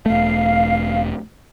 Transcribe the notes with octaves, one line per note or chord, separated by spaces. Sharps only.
E1 A3 F5